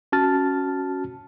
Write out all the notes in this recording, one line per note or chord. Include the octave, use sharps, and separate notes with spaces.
C#4 F#4 A5 F6 A6